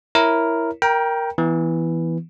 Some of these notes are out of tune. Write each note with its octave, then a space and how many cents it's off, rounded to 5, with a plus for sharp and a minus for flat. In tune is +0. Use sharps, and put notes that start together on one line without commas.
E4 +0 A#4 +0 C#5 +0
A#4 +0 G5 +0 A#5 +35
E3 +0 B3 +0